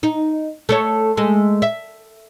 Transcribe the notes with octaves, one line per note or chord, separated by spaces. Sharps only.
D#4
A3 A4 C#5
G#3 A3
E5